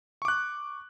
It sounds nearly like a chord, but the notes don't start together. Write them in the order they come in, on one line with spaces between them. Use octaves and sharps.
C#6 D6 F#6